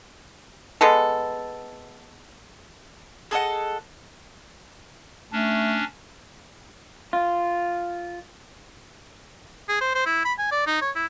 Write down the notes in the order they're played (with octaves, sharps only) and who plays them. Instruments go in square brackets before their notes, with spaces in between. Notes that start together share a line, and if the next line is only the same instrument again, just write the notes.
[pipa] G#3 B3 A4
[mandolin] G#4 A4 D#5 F#5
[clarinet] A3 [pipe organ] C#4 D4
[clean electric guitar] F4
[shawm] G#4
C5
C5
E4
B5
G#5
D5
D#4
C#5
E4